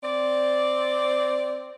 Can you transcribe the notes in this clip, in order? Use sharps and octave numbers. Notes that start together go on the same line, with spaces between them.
C4 D5